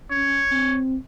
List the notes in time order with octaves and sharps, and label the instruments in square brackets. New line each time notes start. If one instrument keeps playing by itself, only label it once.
[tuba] C#4 [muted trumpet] C#5
[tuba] C4